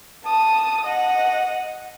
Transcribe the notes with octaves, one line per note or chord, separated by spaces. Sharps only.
A5 D#6
D#5 F#5